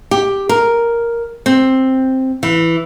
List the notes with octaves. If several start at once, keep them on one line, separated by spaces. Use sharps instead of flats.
G4
A#4
C4
E3